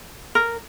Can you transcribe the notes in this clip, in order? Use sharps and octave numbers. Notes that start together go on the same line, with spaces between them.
A#4